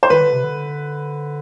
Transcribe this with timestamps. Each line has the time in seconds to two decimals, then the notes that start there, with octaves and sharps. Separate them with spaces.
0.03 C5
0.10 D#3 B4
0.21 D3
0.33 C3
0.44 D3